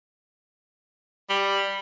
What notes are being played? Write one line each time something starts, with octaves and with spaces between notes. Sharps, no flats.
G3